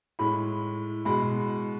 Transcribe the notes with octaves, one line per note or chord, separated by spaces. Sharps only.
A2 G#3 B5
B2 G#3 B5